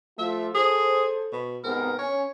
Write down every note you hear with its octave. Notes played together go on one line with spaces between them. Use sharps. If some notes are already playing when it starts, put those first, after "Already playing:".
F3 A3 F4 E5
G#4 A4 C5
B2
G#2 C3 B3 A#4
C#4 C#5